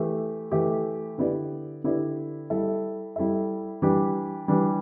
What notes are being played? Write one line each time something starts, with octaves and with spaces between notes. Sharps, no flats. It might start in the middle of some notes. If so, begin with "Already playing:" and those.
Already playing: E3 A3 G4 E5
E3 A3 G4 E5
D3 B3 E4 G4 D5
D3 B3 E4 G4 D5
G3 E4 A4 E5
G3 E4 A4 E5
E3 G3 D4 G4
E3 G3 D4 G4